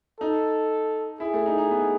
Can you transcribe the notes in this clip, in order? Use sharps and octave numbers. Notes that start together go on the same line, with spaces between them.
D#4 A4
E4 G#4
A3
D#4
D#4
B3